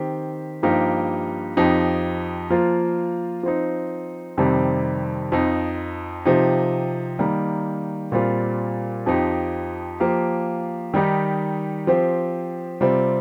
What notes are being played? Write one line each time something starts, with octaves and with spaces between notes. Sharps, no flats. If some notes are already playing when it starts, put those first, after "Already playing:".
Already playing: D#3 C4 G4
G2 F3 A#3 D#4 G4
F2 F3 D#4 G4
F3 A#3 F4
F3 C4 D#4
F2 C3 D#3 G3 C4
F2 F3 D#4
C3 F3 D#4 G4
D#3 G3 A#3
A#2 G3 C4 F4
F2 F3 D#4 G4
F3 A#3 G4
D#3 G3 D#4 G4
F3 C4 G4
C3 G3 C4 F4